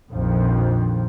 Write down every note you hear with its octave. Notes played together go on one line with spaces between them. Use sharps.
A#1 F2 D#3 F3